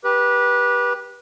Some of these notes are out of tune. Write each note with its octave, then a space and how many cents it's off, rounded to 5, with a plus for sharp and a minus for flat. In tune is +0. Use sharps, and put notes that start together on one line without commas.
G4 +0 B4 -25